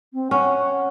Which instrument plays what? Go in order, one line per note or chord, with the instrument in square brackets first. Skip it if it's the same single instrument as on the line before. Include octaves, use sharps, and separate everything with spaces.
[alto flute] C4
[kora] C#4 [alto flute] F#5